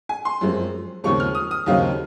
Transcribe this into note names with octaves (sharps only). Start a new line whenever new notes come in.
G#5
C6
F#2 F3 G#3 C4
D#2 C#3 F3 G#3 C4 C#6
F6
D#6
D#6
D#2 C#3 F#3 C4 D#4 F5